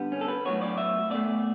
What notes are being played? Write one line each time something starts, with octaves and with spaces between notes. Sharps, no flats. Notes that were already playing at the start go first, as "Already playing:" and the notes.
Already playing: D3 G3 B3
C#4
A4
B4
A2 F#3 B3 C#5
D5
E5
B2 A3 D5